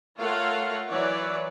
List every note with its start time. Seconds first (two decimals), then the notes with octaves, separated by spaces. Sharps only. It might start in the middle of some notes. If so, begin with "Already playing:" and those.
0.19 A3 F4 A#4 C#5 F5 F#5
0.90 E3 F#3 B4 C#5 D5